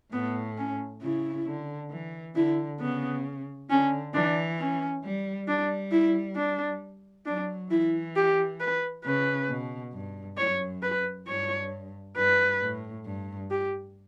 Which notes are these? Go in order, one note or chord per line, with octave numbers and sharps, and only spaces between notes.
A2 B3
C#4
C#3 E4
D3
E3
D3 E4
C#3 B3
D3 C#4
E3 D4
C#4
G3
G3 D4
E4
D4
F#3 D4
E3 E4
G4
B4
C#3 B4
B2
G2
F#2 C#5
B4
G2 C#5
G2 B4
A2
G2
G4